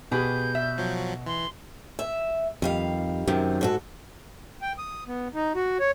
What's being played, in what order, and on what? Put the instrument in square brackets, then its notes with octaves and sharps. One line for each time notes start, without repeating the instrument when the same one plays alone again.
[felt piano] B2 [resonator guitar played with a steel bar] G4 G#4 B4 [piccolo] G6
[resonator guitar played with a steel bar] E5
[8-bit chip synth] F3 F#3
[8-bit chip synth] E3 [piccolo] C6
[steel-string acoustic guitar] E5
[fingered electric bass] F2 [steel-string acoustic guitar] D#3 G3 F5
[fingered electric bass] F#2 [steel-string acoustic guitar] C3 D#3
[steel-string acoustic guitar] G#2 F#4 A4
[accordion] G5
D#6
B3
D#4
F#4
C#5